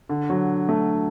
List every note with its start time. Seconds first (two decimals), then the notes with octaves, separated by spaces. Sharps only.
0.09 D3
0.30 F#3
0.69 A3